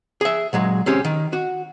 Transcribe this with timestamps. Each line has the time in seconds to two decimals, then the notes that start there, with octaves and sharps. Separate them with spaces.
0.21 G#4 E5
0.53 A#2 F#3 G#3
0.86 C#2 C4 C#4 G4
1.05 D#3
1.33 F#4